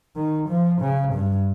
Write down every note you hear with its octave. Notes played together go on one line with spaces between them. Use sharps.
D#3
F3
C#3
G2